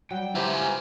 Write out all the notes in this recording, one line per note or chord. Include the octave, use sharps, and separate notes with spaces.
F#3 G3 G5
E4 F4 G4 B4 C5 G#5 A#5
A#4